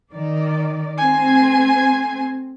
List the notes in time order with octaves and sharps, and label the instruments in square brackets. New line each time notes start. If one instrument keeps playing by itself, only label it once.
[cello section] D#3 D5
[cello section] A3 C4 C5 [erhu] G#5